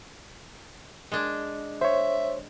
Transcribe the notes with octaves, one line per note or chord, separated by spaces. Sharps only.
G#3 D4
C5 C#5 E5